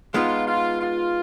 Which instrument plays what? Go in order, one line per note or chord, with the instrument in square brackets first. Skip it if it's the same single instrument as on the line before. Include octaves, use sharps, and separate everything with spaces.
[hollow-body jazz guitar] G#3 B3 D#4 [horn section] F4
[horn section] F4
F4